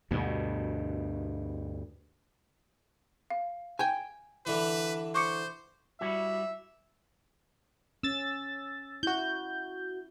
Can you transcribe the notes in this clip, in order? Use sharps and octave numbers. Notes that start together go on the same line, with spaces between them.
D2 G2 B2
F5
G5 G#5
D3 E3 B4
C5 C#6 D6 C#7
G3 E4 F#4 E5
C#4 E6 A6
E4 F#4 G6